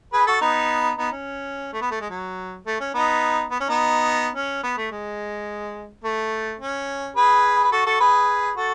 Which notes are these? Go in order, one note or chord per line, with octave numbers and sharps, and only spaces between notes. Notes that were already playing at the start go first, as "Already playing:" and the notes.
G#4 B4
F#4 A4
B3 D#4
B3 D#4
C#4
A3
B3
A3
G#3
F#3
A3
C#4
B3 D#4
B3
C#4
B3 D#4
C#4
B3
A3
G#3
A3
C#4
G#4 B4
B4
F#4 A4
F#4 A4
G#4 B4
F#4 A4